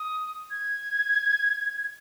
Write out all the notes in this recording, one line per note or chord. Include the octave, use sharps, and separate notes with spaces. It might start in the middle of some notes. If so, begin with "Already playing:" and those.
Already playing: D#6
G#6